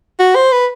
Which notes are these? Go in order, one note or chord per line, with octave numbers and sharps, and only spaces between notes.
F#4
C5
B4